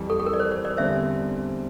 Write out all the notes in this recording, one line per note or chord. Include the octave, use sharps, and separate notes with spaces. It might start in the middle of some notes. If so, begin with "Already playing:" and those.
Already playing: F2 E3 G3
A4
A4
A#4
D5
C5
C5
A#4 D5
E2 D3 G3 C4 C5 E5